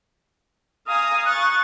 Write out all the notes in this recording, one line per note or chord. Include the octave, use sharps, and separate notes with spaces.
F5 G#5 A#5 D#6
C#6 F#6 A6